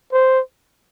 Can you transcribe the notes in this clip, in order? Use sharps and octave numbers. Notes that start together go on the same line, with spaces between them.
C5